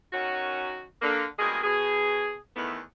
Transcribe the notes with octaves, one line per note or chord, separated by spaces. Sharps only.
F#2 D#3 C#4 F#4
D3 A#3
G2 B2 G#3 A#3 G#4
B2 G#4
E2 A2 D#3 E3 A3 B3